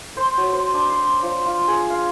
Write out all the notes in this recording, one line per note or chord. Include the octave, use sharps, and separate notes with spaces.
C5
F#3
C5
D4
C6
F3
F4
G#4
F5